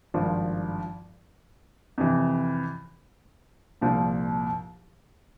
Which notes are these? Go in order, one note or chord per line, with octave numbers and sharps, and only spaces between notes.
G#1 G2 F3
F2 C3 E3
C2 A#2 F3